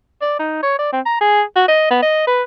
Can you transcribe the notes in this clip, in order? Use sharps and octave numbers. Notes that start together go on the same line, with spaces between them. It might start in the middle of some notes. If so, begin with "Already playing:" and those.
D5
D#4
C#5
D5
C4
A#5
G#4
F#4
D#5
B3
D#5
B4